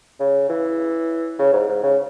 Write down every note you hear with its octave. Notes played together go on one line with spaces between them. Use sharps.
C#3
E3
C#3
G#2
G#2
C#3